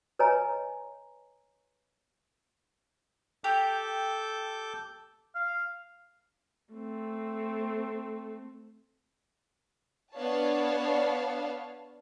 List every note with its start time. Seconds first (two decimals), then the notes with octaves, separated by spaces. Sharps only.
0.19 B4 C#5 D#5 G#5 A#5
3.44 G4 A4 D6 G6
5.35 F5
6.73 A3 C4
10.15 B3 D4 C#5 D5 F5 A5